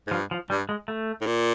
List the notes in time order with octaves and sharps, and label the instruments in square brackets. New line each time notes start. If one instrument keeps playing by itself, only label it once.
[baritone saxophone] G#2
[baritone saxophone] G2 [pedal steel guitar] F3
[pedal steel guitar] F3
[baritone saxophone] G2 [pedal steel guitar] G3
[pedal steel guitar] G#3
A3
[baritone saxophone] A2
A#2